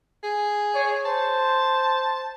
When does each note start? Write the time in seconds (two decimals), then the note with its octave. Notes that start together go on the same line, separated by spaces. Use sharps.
0.23 G#4
0.74 C#5
1.05 C5 A5